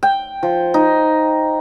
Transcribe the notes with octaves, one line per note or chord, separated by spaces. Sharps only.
G5
F3
D#4